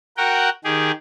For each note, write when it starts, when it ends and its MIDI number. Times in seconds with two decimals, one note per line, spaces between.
0.17 0.49 66
0.17 0.49 70
0.17 0.49 78
0.17 0.49 79
0.65 0.92 51
0.65 0.92 67
0.65 0.92 68